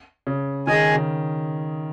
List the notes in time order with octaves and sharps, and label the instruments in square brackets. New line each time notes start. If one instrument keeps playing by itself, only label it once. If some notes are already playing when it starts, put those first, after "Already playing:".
[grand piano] C#3
[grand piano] D#3 [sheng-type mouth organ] G#4 D#5 G#5
[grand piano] C#3